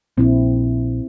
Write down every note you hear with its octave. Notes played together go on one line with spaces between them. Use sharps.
A#1 C4 E4